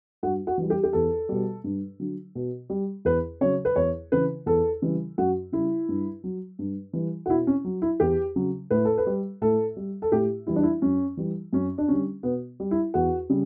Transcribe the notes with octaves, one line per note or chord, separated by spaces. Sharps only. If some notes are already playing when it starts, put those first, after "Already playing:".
G2 F#4
F#4
E3 G3
G4
G4
E2 A4
B2 G3
G2
D3 F#3
B2
G3
E2 B4
C#3 F#3 C#5
B4
E2 C#5
C#3 E3 B4
E2 A4
C#3 E3 G3
F#2 F#4
C#3 G3 E4
G2
F#3
G2
E3 G3
F#4
B2 E4
C#4
F#3
E4
E2 G4
C#3 F#3
A2 B4
A4
B4
G3
A2 A4
G3
A4
A2 G4
E3 G3 E4
D4
E4
F#2 C#4
E3 G3
F#2 C#4
D4
D3 G3 C#4
B2 B3
G3
E4
E2 F#4
C#3 G3